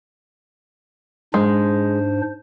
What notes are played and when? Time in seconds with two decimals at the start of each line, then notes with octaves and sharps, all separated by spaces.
1.34 G#2 G#3 D4 C5